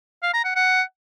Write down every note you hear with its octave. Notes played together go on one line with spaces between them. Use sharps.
F5
A#5
F#5
F#5